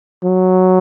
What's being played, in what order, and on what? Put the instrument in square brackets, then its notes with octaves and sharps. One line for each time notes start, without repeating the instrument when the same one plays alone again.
[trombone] F#3